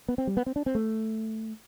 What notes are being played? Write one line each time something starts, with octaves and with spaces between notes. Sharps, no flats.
B3
C4
G3
B3
C4
D4
C4
A3